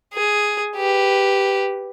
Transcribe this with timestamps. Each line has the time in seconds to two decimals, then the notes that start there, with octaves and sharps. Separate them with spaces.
0.14 G#4
0.76 G4 B4